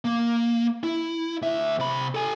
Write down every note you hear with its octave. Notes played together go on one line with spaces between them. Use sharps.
A#3
E4
D2 E5
C3 B5
A4 G#5